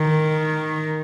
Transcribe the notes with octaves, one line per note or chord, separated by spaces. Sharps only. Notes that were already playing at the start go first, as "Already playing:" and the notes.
Already playing: D#3